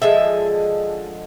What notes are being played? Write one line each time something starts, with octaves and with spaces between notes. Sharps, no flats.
D3 F3 G#3 E5